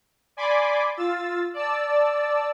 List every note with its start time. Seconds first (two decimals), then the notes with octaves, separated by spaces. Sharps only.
0.37 D5 G#5 B5 C6 D6
0.97 F4 E6 A6
1.54 D5 A5 E6